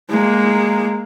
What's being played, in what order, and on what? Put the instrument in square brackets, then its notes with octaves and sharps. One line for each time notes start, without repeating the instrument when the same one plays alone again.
[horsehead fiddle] G#3 A#3